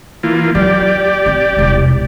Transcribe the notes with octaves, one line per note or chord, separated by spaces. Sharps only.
E3 A#3 F4
F#3 G4 D5
C4
E1 C2